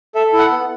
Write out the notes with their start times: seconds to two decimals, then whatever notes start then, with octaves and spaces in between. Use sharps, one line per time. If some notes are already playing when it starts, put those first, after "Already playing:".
0.15 A4 E5
0.33 E4
0.39 F#5
0.51 B3